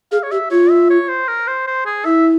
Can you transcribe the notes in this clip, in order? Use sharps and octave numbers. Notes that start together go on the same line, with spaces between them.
G#4 F5
C#5
G4 E5
F4 C#5
E5
C#5
C5
A#4
C5
C5
G#4
E4 E5